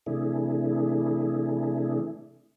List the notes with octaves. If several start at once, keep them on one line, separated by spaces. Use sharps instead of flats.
C3 E3 A3 D4 E4 G#4